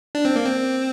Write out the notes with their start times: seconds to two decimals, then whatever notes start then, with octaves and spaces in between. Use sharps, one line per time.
0.15 D4
0.25 C4
0.36 A#3
0.46 C4